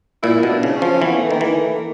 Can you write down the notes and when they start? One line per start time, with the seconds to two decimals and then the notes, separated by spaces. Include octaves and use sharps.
0.23 A#2 E4
0.43 B2
0.50 D4
0.63 C#3
0.70 C4
0.76 C#4
0.82 F3
1.02 E3 B3
1.17 A3
1.28 D#3 A#3
1.41 E3
1.55 A3
1.75 A#3